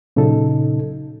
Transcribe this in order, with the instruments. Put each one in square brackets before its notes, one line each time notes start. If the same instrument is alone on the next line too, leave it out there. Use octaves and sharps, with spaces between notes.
[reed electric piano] A#2 C#3 F#3 D#4 A4